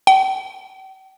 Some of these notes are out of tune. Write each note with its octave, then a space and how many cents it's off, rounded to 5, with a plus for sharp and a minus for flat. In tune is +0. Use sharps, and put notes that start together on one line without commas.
G5 -45